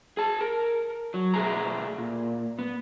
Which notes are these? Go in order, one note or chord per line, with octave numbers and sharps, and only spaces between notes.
G#4 A5
A#4
F#3
B2 A3 G#4 A#5
A#2
B3